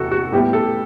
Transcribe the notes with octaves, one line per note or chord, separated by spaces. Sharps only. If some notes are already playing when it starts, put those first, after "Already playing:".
Already playing: E2 C3 F#4 A4
F#4
A2 G3 B3 G4
A4